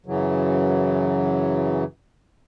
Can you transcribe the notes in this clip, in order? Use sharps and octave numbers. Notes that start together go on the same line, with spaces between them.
F#2 C#3 E3 F#3